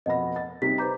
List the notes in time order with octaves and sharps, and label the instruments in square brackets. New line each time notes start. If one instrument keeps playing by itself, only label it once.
[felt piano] F1 B2 A#6 [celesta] D#5 F#5 B5
[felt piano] A6
[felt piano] C3 G3 D#4 [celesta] B6
[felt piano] B4 C5 [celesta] A#5 D6 G6